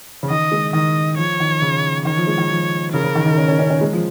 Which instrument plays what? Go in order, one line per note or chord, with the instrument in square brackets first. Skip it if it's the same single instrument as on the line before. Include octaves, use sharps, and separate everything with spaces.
[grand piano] C#3
[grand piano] D#3 [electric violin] D#5
[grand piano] G#3
[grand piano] D#3 [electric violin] D#5
[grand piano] F3 [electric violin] C#5
[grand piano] D#3
C#3
[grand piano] D#3 [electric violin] C#5
[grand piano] F3
G#3
D#3
F3
[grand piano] C#3 [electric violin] A#4
[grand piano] C#3
D#3
D#3
C#4
C#4
C#4
C#4
G#3
F3